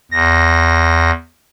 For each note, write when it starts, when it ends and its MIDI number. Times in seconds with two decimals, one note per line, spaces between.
0.12 1.11 40
0.12 1.11 94